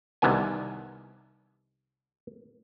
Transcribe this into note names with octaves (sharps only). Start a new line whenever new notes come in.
C2 C3 D#3 E3 B3 G#5